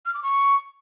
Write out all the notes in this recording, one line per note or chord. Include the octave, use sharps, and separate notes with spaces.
F6
D6
C#6